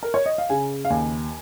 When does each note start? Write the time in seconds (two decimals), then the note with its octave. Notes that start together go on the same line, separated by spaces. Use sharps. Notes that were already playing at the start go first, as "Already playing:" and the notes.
0.03 A#4
0.14 C#5
0.26 D#5
0.38 F5
0.50 C#3 G#5
0.85 F5
0.90 D#2 G#5